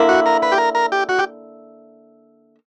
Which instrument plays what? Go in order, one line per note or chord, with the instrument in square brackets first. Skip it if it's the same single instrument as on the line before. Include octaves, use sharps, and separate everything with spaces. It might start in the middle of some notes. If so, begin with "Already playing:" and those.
Already playing: [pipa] D3 A#3 E4
[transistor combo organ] F#4
A#4
B4
G4
A#4
A#4
G4
F#4
G4